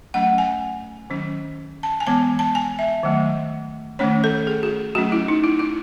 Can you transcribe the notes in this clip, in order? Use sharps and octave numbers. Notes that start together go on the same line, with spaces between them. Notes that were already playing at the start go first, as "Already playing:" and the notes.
F#3 A3 C#4 F#5
G#5
D#3 F#3 C#4
A5
G#5
E3 G#3 B3 A5
A5
G#5
E5
D#3 F#3 A3
D#3 A3 C#4 C#5
A4
G#4
F#4
F#3 A3 C#4 F#4
E4
D#4
E4
E4